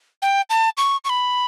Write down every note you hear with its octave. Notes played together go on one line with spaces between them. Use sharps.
G5
A5
C#6
C#6
B5